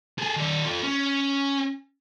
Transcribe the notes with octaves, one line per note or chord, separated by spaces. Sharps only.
G#4 A4
D#3 D5
F4 A4
C#4